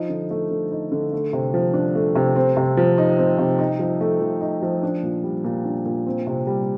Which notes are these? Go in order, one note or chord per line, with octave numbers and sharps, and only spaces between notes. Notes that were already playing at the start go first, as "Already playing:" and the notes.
Already playing: F3 D#4
D3
A3
D3
D#4
D3
A3
C3
F3
D4
A3
C3
C4
C3
F3
D#4
C4
C3
D#4
F3
A3
F3
D#4
F3
D4
A#2
G3
A#2
D4
A#2
C4
C3
G3